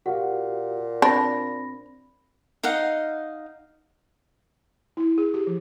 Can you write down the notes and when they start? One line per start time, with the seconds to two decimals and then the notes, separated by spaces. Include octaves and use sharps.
0.06 A#2 F#4 G4 F5 F#5
1.02 C4 D4 B5 A#6
2.63 D#4 D#5 F5 F#5
4.97 E4
5.18 G#4
5.34 G4
5.47 F3